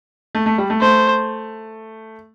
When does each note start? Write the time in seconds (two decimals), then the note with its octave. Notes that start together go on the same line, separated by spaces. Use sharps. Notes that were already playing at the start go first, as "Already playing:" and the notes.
0.35 A3
0.46 A3
0.58 G3
0.70 A3
0.81 A3 C5